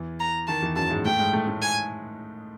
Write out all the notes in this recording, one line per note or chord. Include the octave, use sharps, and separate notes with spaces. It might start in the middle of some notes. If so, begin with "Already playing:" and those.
Already playing: E2 E3
A#5
D#3 A5
E2 E3
F#2 F#3 A5
G#2 G#3
A2 A3 G5
G#2 G#3
A2 A3
A2 A3
G#5